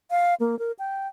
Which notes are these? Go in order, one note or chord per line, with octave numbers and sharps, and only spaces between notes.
F5
A#3
A#4
G5